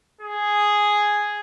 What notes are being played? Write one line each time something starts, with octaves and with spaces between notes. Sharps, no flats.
G#4